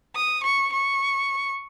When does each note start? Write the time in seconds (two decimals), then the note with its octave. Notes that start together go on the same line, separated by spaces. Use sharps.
0.15 D#6
0.43 C#6
0.72 C#6